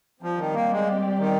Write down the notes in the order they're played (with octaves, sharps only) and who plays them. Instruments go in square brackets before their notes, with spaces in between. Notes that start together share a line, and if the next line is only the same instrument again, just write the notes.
[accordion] F3 [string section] G3 C4 G4 D5
[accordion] D#3
A#3
G#3
D#3